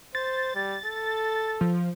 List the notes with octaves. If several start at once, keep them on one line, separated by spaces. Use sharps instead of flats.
C5 A6
G3
A4
F3